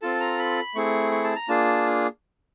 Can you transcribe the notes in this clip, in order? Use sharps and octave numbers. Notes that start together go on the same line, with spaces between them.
C4 F4 A4 A5
A#5
B5
A3 C4 E4 G#4 C#6
C#6
A5
A#5
A#3 D4 F4 G#4 A5